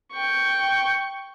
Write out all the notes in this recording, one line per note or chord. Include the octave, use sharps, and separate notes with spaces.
G5 C#6